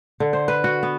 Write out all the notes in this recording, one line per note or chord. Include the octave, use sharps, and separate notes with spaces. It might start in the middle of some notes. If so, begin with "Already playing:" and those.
D3
C5
B4
F#4
B3